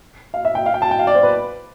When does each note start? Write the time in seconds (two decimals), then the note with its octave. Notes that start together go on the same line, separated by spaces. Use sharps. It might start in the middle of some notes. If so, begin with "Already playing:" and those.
0.34 F5
0.45 E5
0.55 G5
0.66 F5
0.74 G5
0.82 A5
0.91 G5
0.99 F5
1.07 D5
1.15 C5
1.23 B4